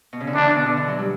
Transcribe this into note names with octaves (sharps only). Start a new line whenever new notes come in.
B2
C#3
D3
E3 D4
D3
B2
D3
E3
F#3
G3